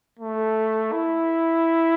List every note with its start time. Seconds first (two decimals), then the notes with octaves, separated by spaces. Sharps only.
0.19 A3
0.92 E4